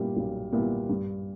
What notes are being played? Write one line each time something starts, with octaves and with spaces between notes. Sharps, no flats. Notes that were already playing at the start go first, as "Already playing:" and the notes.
Already playing: A#2 G3 B3 E4
B1
A#2 G3 B3 E4
G2